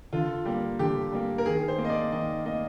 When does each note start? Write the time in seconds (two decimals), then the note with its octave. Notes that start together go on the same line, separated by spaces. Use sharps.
0.13 D3 F4
0.45 G3 A#3
0.79 D3 G4
1.12 G3 A#3
1.38 A#4
1.45 D#3 G#4
1.68 C5
1.78 A#3
1.85 D#5
1.90 D5
2.12 D#3 D#5
2.45 A#3 D#5